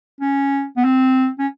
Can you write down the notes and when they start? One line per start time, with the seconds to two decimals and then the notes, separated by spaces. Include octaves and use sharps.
0.21 C#4
0.77 B3
0.84 C4
1.39 C#4